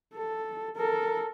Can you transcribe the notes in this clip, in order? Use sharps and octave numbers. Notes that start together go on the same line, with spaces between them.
A4
A4 A#4